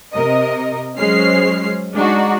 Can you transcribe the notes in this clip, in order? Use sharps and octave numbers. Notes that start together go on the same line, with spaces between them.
C3 A#4 D#5
F#3 G#3 C#4 C5 F6 C7
G#3 D4 D#4 F#4